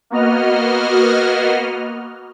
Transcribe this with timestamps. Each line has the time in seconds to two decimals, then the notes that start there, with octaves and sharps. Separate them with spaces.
0.10 A#3 B3 F#4 D#5 F6